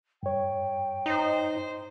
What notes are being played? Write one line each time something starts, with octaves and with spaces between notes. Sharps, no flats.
G2 C#5 G5
D#4 C5